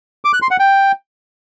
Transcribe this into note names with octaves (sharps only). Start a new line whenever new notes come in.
D6
F#6
C6
F#5
G5